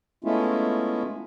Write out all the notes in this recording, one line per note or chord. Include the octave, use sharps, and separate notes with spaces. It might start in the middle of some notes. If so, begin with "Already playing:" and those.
G#3 A3 B3 C#4 E4 F4